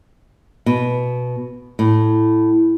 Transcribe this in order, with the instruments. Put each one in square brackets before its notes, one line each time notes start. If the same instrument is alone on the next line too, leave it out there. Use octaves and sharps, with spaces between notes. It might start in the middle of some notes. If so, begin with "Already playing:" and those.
[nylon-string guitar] B2
A2